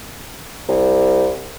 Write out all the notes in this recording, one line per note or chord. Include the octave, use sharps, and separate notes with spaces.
C2